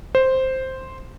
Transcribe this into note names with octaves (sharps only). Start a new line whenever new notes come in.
C5